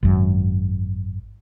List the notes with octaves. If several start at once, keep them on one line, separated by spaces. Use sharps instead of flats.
G#1 F#2